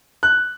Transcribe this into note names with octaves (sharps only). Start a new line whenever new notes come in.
F#6